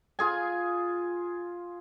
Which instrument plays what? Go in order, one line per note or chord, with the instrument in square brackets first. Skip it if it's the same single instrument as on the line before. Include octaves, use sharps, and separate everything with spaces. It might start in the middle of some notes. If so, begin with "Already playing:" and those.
[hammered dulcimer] F4 G#4 G#5